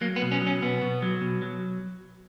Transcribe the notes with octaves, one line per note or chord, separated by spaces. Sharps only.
F#3 A#3
B3
B2
C#4
F#3 C#4
B2 B3
B2
F#3
B2
F#3